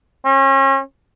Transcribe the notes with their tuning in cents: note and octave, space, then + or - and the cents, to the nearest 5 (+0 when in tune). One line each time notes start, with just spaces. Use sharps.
C#4 -35